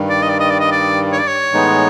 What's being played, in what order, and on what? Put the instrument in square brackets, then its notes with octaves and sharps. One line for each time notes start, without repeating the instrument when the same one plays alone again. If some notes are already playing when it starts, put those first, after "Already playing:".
Already playing: [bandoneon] G2 D#3 G3
[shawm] D5
D#5
D5
D#5
D5
D#5
D5
C#5
D5
C#5
[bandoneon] A2 E3 G#3 B3 D#4